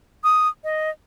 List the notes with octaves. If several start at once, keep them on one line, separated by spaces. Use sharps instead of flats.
D#6
D#5